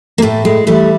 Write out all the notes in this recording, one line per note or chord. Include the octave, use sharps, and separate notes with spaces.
A#3
A2 A3
G#3
E3 G3 A3